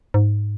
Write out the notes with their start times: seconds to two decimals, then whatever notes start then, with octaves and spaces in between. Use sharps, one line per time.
0.14 G#2